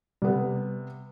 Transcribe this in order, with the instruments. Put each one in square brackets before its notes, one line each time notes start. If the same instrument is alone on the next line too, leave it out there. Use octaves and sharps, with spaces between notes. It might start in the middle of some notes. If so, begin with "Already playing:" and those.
[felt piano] C3 B3 [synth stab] G3